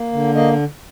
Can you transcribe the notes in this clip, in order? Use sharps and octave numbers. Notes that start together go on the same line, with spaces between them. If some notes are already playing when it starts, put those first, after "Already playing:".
Already playing: A#3
D3
A#3 D#5